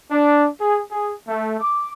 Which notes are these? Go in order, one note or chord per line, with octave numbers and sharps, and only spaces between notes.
D4
G#4
G#4
A3
D6